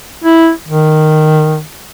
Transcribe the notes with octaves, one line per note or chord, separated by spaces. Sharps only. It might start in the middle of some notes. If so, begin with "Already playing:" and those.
E4
D#3